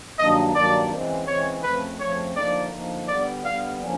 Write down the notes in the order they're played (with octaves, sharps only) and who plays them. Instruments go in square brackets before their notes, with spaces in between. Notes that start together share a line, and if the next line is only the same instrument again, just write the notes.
[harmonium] G2 D#3 F#3 A#3 D4 [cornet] D#5
[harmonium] G2 D#3 F#3 A#3 D4 [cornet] D5
[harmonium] C#3 E3 G#3 C4
[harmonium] C#3 E3 G#3 C4 [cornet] C#5
[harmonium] F2 C#3 F3 A3 C4 [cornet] B4
[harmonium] F2 C#3 F3 A3 C4 [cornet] C#5
[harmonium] D3 F3 A#3 D#4 [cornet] D5
[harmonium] D3 F3 A#3 D#4
[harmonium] D3 G3 B3 [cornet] D5
[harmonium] D3 G3 B3 [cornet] F5
[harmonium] D3 F3 A#3 C#4